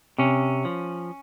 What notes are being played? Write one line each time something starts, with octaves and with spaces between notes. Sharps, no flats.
C3 C#4
F3